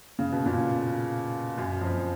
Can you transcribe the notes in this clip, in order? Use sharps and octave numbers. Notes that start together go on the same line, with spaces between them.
C#3
B2
A#2 C#3
F#2
F2